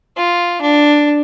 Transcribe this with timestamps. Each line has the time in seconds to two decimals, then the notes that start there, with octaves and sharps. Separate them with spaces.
0.17 F4
0.61 D4